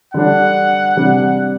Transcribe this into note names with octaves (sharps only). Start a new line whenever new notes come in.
D3 G3 D4 F#5
C3 G3 D4